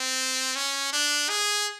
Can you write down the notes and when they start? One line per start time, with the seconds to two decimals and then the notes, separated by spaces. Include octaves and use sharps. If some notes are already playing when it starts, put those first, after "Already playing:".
Already playing: C4
0.56 C#4
0.93 D4
1.29 G#4